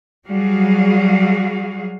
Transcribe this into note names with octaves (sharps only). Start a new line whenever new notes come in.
F#3 G3 F#4 G#4 F5